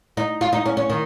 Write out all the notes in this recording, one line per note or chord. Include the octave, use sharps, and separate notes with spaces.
D#4
F4
D#4
C#4
C#4
D#3